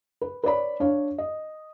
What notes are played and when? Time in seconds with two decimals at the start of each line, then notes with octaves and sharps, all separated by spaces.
0.21 B4
0.44 B4 C#5 D5 B5
0.80 D4 C#5 F5
1.18 D#5